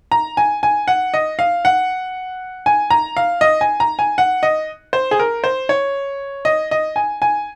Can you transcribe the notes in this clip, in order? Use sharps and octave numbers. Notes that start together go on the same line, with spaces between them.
A#5
G#5
G#5
F#5
D#5
F5
F#5
G#5
A#5
F5
D#5
G#5
A#5
G#5
F#5
D#5
C5
G#4
A#4
C5
C#5
D#5
D#5
G#5
G#5